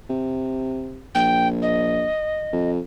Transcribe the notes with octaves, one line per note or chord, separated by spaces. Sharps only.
C3
A#1 G5
D#5
F2